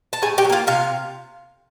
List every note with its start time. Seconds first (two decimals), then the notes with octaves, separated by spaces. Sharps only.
0.13 A5
0.22 A2 G#4 G#5
0.38 G4 G5
0.45 F#3
0.50 A#3 F4 F5
0.67 C3 F4 F5